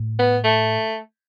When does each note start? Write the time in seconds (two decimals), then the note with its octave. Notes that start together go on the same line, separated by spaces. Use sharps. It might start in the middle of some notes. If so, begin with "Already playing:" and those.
Already playing: A2
0.19 B3
0.44 A3